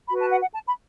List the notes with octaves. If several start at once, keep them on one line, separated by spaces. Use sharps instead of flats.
F#4 B4 B5
A5
F#5
F#5
A5
B5